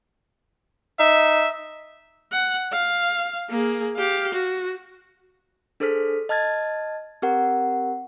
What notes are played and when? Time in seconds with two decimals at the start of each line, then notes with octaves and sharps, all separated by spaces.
1.00 D#4 E5
2.32 F#5
2.72 F5
3.49 A#3 G#4
3.97 G4 F5
4.34 F#4
5.80 D4 G#4 A4 C5 F6 B6
6.29 D#5 A5 F6 G#6 A6
7.22 C4 G4 A#4 F#5